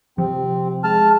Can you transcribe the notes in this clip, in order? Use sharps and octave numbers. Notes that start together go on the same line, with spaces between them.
C3 F3 C4
G#3 A5 F6